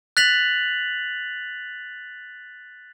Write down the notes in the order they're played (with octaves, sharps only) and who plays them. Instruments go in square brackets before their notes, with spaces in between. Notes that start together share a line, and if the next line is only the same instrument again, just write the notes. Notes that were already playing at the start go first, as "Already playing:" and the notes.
[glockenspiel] F#6 A6 B6 F7 F#7